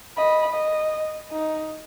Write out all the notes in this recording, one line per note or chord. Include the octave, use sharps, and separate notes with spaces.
D#5 B5
D#5
D#4